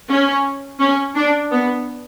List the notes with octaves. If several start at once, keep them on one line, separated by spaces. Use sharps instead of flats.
C#4
C#4
D4
B3